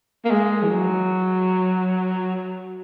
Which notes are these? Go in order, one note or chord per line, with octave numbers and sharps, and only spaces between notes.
A#3
G#3
E3
F#3